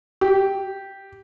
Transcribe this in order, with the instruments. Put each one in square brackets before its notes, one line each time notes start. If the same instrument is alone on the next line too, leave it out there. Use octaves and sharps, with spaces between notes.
[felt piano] G4